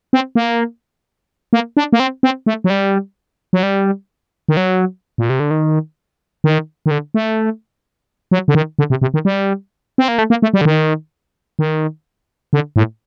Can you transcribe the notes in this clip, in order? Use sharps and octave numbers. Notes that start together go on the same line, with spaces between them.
C4
A#3
A#3
D4
A#3
C4
C4
A3
F#3
G3
F#3
G3
D#3
F#3
A#2
C3
D3
D#3
D#3
D#3
D3
A3
F#3
D3
D#3
D3
C3
C3
D#3
G3
C4
A#3
A3
A#3
A3
G3
D3
D#3
D#3
D3
A2